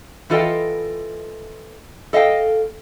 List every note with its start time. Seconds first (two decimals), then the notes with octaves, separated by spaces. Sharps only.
0.30 E3 F4 A4 D#5 G5
2.13 A4 D#5 F5 G5